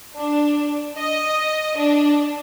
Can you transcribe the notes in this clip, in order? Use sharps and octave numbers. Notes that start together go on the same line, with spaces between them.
D4
D#5
D4